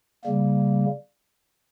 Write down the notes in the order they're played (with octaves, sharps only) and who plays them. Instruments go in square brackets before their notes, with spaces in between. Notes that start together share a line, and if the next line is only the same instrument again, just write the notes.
[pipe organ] C#3 G3 A#3